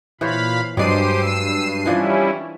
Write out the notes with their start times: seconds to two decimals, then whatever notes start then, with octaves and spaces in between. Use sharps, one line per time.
0.21 A#2 E3 C5 C#5 F5 B5
0.77 G2 F#3 G#3 G4 C5 D5 C7 D#7
1.22 E6
1.85 E3 F3 G3 C#4 D4 E4